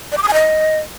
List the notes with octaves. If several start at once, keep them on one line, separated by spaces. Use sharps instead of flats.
D5
D6
D#6
G#5
D#5